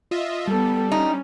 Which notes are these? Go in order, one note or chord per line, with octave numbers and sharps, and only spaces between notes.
F4 D#5 E5
G3 B3 A4
C#4 D#4